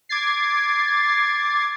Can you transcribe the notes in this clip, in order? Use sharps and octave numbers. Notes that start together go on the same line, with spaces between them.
D6 G#6 A6 C7